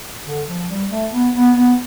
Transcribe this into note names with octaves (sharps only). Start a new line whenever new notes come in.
D3
F3
G3
A3
B3
B3
B3